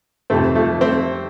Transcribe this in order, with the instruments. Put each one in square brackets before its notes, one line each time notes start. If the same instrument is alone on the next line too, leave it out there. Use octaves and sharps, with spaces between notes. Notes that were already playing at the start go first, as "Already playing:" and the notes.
[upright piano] F2 C3 D#3 [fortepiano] A3 C4
[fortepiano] F3 A3
A3 C4